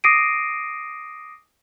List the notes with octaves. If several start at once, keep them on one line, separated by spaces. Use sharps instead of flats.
D6 D#6 A#6 C7 D7 D#7